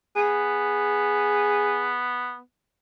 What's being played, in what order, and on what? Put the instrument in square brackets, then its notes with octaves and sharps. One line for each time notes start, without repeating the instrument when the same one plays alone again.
[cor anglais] B3 [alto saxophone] G#4